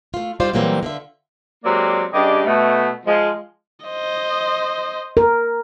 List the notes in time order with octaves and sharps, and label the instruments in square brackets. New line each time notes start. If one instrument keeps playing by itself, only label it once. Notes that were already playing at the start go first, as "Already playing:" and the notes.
[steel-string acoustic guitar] A3 F4
F3 G3 D#4 F4 C5 D5
A#2 E3 F#3 G3 A#3 C4
D3 F4 E5
[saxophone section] F#3 G#3 A#3 C4 G4 D5
G2 C#3 G4 G#4 D5 D#5
B2 A3
F3 G#3
[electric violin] C5 D#5
[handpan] A#4